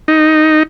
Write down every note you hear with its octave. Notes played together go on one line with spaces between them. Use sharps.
D#4